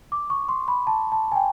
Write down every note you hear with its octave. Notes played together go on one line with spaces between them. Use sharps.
D6
C#6
C6
B5
A5
A5
G#5
G5